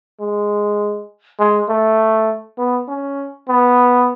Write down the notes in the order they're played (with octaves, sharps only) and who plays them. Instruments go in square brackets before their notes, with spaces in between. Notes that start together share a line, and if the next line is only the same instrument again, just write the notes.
[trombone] G#3
G#3
A3
B3
C#4
B3